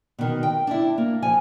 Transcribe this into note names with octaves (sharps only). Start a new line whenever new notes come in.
B2 D#3
G5
D4 E4
A#3
F3 G#5